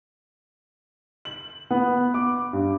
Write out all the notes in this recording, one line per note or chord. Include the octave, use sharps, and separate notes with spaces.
F#7
B3
D6
G2